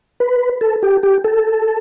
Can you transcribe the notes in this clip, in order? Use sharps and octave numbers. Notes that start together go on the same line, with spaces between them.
B4
A4
G4
G4
A4